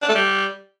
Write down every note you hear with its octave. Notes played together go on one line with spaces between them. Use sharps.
D4
A3
G3